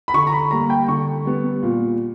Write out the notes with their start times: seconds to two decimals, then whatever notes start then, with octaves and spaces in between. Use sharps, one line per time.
0.08 B5
0.14 D3 C#6
0.27 A#5
0.33 B5
0.51 G3 A#3 A#5
0.70 G5
0.88 D3 C#6
1.25 G3 B3
1.63 A#2